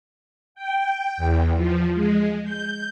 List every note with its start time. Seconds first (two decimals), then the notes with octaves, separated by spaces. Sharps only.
0.55 G5
1.17 E2
1.55 F3
1.94 G#3
2.43 G6